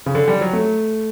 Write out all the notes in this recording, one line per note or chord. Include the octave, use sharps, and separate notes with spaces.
C#3
D3
G3
F#3
A3